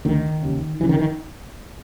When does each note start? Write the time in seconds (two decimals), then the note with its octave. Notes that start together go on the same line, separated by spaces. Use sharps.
0.05 D2 D3 D#3
0.42 D#2 C#3
0.80 D#2 C#3 E3
0.89 D#3
0.99 D#3